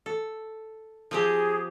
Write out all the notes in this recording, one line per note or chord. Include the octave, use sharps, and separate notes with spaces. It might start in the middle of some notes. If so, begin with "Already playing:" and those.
A4
F3 C4 G4 G#4